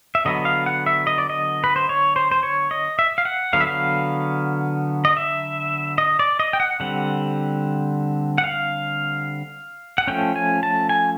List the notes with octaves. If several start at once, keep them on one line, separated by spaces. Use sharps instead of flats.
E5
D3 F#3 B3 D#5
F5
F#5
E5
D#5
D5
D#5
B4
C5
C#5
C5
C5
C#5
D#5
E5
F5
F#5
D3 F#3 B3 F5
E5
F5
D#5
E5
D#5
D5
D#5
G5
F#5
D3 G3 C4 F#5
F#5
F5
F#5
F3 A3 C#4 G5
G#5
A5
G#5